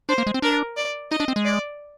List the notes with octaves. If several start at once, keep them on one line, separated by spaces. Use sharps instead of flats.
D4 C5
A#3
G#3
C4
D4 A#4
D5
D#4 D#5
D4
C4
G#3
D5